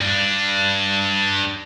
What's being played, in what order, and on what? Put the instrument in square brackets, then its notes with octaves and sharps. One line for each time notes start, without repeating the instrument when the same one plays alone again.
[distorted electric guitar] G2 D4